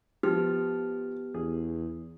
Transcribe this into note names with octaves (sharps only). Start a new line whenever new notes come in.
F3 B3 G4 F6
E2 G#4